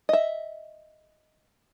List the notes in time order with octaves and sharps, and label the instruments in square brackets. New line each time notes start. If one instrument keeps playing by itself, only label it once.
[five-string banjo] D#5 E5